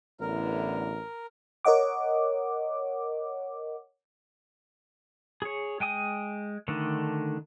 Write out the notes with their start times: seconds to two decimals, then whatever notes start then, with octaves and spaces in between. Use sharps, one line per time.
0.20 A1 D3 B3 E4 A#4
1.65 A#4 C#5 D#5 F#5 D6
5.42 G#4 C#5
5.80 G#3 G5 G#5 D#6
6.68 D3 D#3 A3 D4